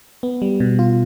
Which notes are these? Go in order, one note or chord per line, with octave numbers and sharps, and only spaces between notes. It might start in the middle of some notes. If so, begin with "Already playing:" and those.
B3
G3
B2
F4